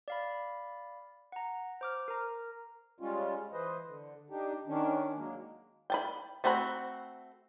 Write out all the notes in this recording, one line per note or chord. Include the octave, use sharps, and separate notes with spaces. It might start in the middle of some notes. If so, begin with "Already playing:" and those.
D5 F5 B5
F#5 A#5
C5 D6 F6
A#4 A#5
G3 G#3 C#4 F4
E3 B4 C5 D#5
D3
D4 D#4 G4
D#3 C#4 D4
F#3 G#3 A#3
G5 A5 B5
A3 C4 F#4 C5 B5